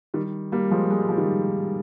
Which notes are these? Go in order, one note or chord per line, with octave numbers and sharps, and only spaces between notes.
D#3 G3
G3 A#3
F3 G#3
G#3
G3
F3
D#3 G3